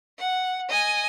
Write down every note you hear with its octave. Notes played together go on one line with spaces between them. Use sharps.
F#5
D#5 G#5